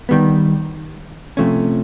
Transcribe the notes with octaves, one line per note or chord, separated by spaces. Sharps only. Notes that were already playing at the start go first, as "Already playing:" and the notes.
D#3 G3 B3
C3 F3 A3 C#4